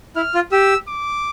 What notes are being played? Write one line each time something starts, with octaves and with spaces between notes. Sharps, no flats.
E4 F6
F4
G4 E6
D6